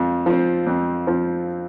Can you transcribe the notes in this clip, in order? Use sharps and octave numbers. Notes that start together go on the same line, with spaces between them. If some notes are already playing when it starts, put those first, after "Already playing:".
Already playing: F2 F3
F3 C4
F2
F3 C4